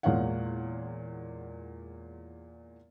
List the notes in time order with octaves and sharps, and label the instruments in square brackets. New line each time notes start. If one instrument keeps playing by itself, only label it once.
[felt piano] E2 A#2 G#3 C#5 F5 F#5